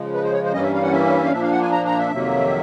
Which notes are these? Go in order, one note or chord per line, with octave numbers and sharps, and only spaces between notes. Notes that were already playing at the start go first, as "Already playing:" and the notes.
Already playing: C#3 F3 G#3
B4
C5
C#5
C5
G2 E3 G3 A#3 C#4 D#5
E5
F5
F#5
E5
F5
A#2 F3 A#3 D4 E5
F5
F#5
G#5
A#5
A#5
E5
F2 C3 D#3 F#3 A#3